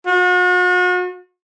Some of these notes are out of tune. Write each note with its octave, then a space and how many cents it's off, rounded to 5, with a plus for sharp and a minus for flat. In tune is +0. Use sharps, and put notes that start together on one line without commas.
F#4 -40